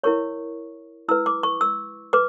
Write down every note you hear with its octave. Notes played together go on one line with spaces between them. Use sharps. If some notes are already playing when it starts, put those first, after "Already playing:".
E4 A#4 C#5 C#6
E4 B4 E6
D6
C#6
E6
B4 D6